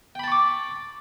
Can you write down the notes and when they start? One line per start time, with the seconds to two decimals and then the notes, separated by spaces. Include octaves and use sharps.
0.15 G5
0.19 B5
0.23 A5
0.28 C#6
0.32 D6